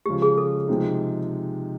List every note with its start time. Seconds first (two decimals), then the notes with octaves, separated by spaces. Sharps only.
0.06 C#3 F3 G#3 G4
0.22 G#4
0.38 A4
0.68 C3 F3 G#3 C4 D#4